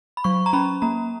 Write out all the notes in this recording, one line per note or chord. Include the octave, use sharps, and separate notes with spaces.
B5
F#3 C#6
A#5
C#4 B5
A#3 A#5